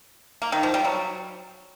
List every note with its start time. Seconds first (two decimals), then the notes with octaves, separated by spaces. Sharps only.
0.42 A#3
0.52 D#3
0.63 F3
0.74 G3
0.85 F#3